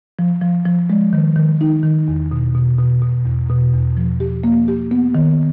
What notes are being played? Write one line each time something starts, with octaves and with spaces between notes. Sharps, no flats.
F3
F3
F3
G#3
D#3
D#3
D#4
D#3
E2
B2
B2
B2
B2
E2
B2
E2
F3
G4
A#3
G4
B3
D#3